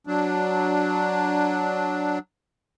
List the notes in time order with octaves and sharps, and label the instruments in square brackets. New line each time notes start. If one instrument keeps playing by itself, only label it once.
[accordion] F#3 D4